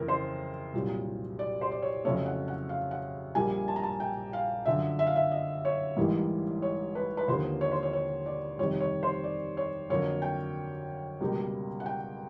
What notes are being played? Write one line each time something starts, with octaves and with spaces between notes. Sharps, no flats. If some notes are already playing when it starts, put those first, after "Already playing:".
Already playing: F2 C#3 E3 A3 A#4
C5
C2 A#2 F#3
D5
C5
D5
C#5
F2 C#3 F#3 A3 C#5
F#5
F#5
F5
F#5
A#1 A#2 G3 A#3 G#5
A5
A#5
A5
G5
F5
F#2 D3 F3 E5
E5
F5
E5
D#5
C#5
A1 G#2 E3 G3 A#3
C#5
B4
B4
D#2 D3 F3 A#3 C5
C#5
C5
C#5
C#5
D5
F2 C3 D#3 G3 C#5
C#5
C5
D5
C#5
F2 D3 F#3 A#3 C#5
G5
C#2 B2 G3 A#3
F#5
G5